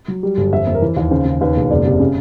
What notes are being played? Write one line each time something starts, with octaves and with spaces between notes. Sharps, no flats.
F#3
G3
G1
F2 E5
F2
A#4
E3 B4
D#2
C#3 C5
C#3
D#2 B4
E1
F#1 D5
C3
C#3